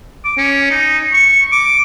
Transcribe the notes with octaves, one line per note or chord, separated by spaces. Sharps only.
D6
C#4
D#4
C#6
D6